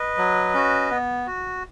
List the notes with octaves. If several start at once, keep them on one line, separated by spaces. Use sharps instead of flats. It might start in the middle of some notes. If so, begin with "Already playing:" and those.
Already playing: B4 D#5
F#3
C#4 F#4
B3
F#4